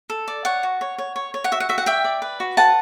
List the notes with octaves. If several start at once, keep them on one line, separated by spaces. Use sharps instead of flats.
A4
D5
C#5 F#5
F#4
C#5
C#5
C#5
C#5
F#5
F#4 E5
F#5
F#4 E5
F#5
D5 E5 G5
D5
B4
F#4
B4 F#5 A5